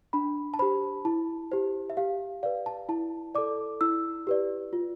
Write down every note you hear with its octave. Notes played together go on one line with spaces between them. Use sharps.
D4 B5
A5
G4 C5 B5
E4 A5
G4 C5
E5
G4 F5
B4 D5 F5
A5
E4 A5
A4 D5 D6
E4 E6
G4 B4 D5
F4